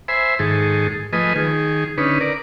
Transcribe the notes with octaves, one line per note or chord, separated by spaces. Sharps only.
C5 E5 G#5 B5
G#2 D#3 G#4 A4
F3 A3 B4 D#5 G#5
D#3 G#4
D3 C#4 D#4 B4
A#4 D5